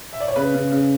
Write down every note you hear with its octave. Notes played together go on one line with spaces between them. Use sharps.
E5
D5
C#5
C#3 B4
C#3
C#3